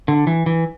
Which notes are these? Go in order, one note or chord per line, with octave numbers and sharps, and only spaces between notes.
D3
E3
E3